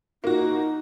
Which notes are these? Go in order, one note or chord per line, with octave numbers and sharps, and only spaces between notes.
A#3 D#4 F#4